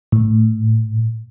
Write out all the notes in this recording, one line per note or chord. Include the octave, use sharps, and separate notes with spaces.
A2